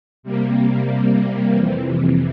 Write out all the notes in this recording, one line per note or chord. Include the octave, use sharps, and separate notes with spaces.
C3 G3 A#3
F2 C3 E3